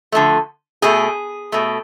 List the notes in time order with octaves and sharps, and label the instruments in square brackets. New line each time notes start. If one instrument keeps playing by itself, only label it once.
[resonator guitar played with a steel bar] D3 F3 A3
B2 A3 G#4
B2 A3